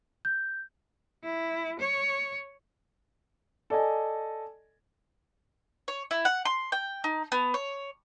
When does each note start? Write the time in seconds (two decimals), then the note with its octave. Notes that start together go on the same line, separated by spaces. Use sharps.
0.25 G6
1.23 E4
1.79 C#5
3.70 A4 D5 D#5 G#5
5.88 C#5
6.11 E4
6.25 F#5
6.45 C6
6.72 G5
7.04 D#4
7.32 B3
7.54 C#5